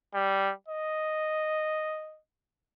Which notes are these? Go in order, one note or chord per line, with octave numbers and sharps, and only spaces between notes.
G3
D#5